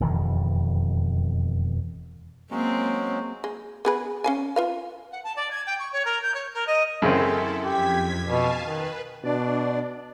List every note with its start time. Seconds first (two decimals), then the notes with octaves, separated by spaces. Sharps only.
0.01 E1 F2 D#3 E3
2.51 F#3 G#3 A#3 C4 C#4
3.44 G#3
3.85 B3 G#4 B4
4.24 C#4 F5 G#5
4.56 F4 B4 F5
5.11 F#5
5.23 A5
5.35 D5
5.50 G#6
5.66 G5
5.79 C#6
5.92 C#5
6.05 A#4
6.22 G6
6.34 C#5
6.53 A#4
6.66 D#5
7.02 F#2 C#3 C4 E4 A4
7.63 F2 G4 G#6 B6
8.25 B2 F5 G#5 A5
8.64 D#3 B4
9.24 B2 D4 D5